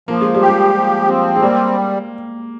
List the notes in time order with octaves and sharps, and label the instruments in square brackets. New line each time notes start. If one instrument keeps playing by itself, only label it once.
[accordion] F3 [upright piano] A#3
[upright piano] G#3
G3
[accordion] G4
[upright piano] G#3
[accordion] F3
C4
[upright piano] G#3
[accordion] G3 [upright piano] A#3